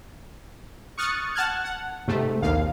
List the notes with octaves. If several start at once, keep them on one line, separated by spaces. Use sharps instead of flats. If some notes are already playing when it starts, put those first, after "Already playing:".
C#6 D#6 F6 F#6 A6 C#7
F#5 A5 F6 F#6 G#6
F#5
G#2 C3 A3
A#1 D#2 F5